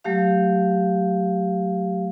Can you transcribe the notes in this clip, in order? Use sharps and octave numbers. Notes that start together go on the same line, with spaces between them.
F#3 A3 G4 F5